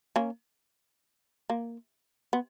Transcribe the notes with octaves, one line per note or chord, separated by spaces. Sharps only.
A#3 C#4
A#3
B3